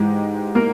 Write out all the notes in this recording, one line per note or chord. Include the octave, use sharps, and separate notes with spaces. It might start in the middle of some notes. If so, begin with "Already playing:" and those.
Already playing: G#2 E3 G#3 G4
A#3 A#4